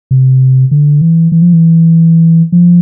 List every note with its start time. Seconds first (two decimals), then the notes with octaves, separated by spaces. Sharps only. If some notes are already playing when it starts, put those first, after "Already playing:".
0.11 C3
0.71 D3
1.01 E3
1.32 E3
1.42 F3
1.53 E3
2.52 F3